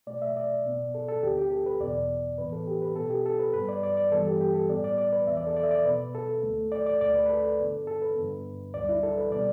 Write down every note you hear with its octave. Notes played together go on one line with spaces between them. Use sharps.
B2 A3 D5
E5
D5
B2 B3
A4
A4
D2 D3 B3 G4
G4
A4
B4
E2 B2 B3 D5
A2 E3 B3 B4
A4
G4
B4
B2 B3 A4
G4
A4
B4
G2 G3 B3 B4
D5
D5
D5
G2 E3 G3 B3 A4
G4
G4
A4
A2 G3 B3 D5
D5
D5
B4
E2 E3 B3 E5
D5
A4
D5
E5
D5
B2 B3 B4
A4
D2 D3 A3
D5
D5
D2 D3 A3 D5
B4
B4
A4
G2 D3 B3
A4
B4
G2 D3 B3
D2 D3 G3 D5
E4
A4
B4
B2 G3 B3 D5